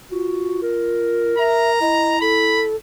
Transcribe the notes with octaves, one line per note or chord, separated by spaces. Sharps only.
F4 F#4
A#4
E5 A#5
E4 D#5
A4 B5